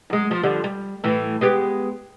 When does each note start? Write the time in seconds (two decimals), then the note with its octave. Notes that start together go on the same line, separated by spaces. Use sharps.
0.10 F#2 G#3
0.31 F3
0.43 D3 F3 G3
0.64 G3
1.04 A2 E3
1.41 G#3 B3 G4